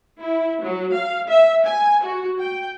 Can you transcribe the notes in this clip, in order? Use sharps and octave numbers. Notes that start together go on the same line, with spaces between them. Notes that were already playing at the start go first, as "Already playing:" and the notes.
E4
F#3
F5
E5
G#5
F#4
G5